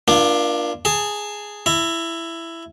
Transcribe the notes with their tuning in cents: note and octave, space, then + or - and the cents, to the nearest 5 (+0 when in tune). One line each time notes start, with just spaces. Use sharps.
A#3 +30 D4 +15 F4 -20
G#4 +0 A5 +25
E4 +10 A#5 -45